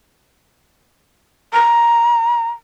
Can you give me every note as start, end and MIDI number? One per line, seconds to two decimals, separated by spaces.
1.53 2.49 82